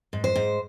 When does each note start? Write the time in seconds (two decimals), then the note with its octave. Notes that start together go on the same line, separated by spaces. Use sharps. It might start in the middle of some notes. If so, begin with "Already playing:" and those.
0.13 G#2
0.24 C5
0.36 G#2